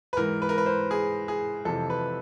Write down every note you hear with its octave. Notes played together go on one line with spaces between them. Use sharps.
B4
G#2 E3 A#4
B4
A#4
B4
C5
G#4
G#4
F2 C3 E3 A4
B4